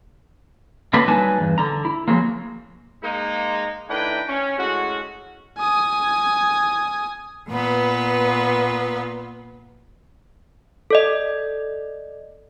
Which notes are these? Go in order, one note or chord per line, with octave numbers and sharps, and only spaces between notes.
D3 F#3 A#3 D4 F#4 B4
F#3 G3 D#4 B4 G#5 A5
E2 G2
D3 A#5
E4
F3 F#3 G#3 A#3
G#3 A#3 D#4
D#3 A3 D4 E4 B4 G5
C#4
A2 G#3 C#4 F#4
G#5 D#6
A#2 B3 B4
A4 D5 D#5